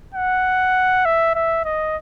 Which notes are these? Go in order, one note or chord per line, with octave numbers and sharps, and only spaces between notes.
F#5
E5
E5
D#5